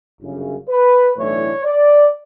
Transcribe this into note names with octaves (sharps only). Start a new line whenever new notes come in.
G1 F#2 C#3
B4
B1 A2 E3 A3 D4 C#5
D5